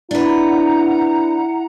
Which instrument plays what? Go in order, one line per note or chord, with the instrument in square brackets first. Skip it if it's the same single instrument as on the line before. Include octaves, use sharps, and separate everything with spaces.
[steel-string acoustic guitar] D4 B4 [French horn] E4 [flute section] F#5 A#5